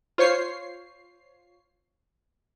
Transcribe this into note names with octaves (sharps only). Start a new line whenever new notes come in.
F4 C5 C#5 C7